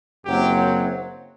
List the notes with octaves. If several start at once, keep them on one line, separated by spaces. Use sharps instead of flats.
F#1 F#2 F#3 C4 G4